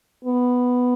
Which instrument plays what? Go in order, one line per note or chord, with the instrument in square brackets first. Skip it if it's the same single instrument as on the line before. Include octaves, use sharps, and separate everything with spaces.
[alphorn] B3